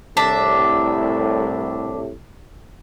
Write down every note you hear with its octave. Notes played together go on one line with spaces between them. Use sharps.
C2 A2 D4 E5